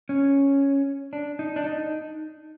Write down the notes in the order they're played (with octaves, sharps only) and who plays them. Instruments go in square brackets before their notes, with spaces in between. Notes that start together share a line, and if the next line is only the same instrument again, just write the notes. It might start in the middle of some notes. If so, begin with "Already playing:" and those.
[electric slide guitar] C#4
D4
D#4
D4
D#4